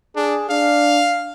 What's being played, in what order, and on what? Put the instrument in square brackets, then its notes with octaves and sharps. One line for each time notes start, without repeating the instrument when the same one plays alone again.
[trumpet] D4 [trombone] G#4
[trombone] D4 [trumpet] F5